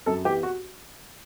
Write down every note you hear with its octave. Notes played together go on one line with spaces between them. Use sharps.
F#2 A4
E3 B3 G4
F#4